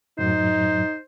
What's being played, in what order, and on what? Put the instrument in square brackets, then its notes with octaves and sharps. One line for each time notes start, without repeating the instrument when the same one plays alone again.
[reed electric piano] F#2 A2 F#3 [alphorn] D#4 [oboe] C5